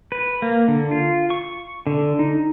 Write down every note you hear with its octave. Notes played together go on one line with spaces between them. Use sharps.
B4
A#3
D3
F4
C#6
D3
D#4